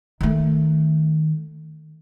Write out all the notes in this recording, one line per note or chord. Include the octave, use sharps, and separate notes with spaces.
D#3 A3